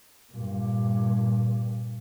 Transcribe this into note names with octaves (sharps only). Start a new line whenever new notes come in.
G2 A#2